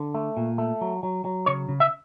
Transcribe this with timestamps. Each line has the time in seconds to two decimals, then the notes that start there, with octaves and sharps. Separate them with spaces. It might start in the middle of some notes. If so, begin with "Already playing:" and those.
Already playing: D3
0.14 A3
0.37 A#2
0.58 A3
0.81 F#3
1.03 F#3
1.25 F#3
1.46 C#3 C#5
1.69 C#3
1.80 E5